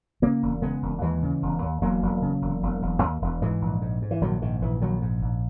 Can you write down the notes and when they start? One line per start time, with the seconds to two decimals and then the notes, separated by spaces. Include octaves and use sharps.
0.22 C#3 A#3 C#4
0.43 E1
0.62 C#3 G#3 B3
0.83 E1
1.02 D#2 E3 G#3
1.22 C#3
1.43 E1
1.62 D#2
1.81 E1 F#3 A#3
2.02 E1
2.22 C#3
2.42 E1
2.63 E1
2.82 E1
3.02 D#2
3.22 E1
3.42 G#2 E3 G#3
3.62 A#1
3.81 G#2
4.02 G#2
4.11 E3
4.21 A#1 D#3 F#3
4.42 G#2 D#3
4.61 A#1 E3
4.81 A#1 D#3 F#3
5.01 G#2
5.22 A#1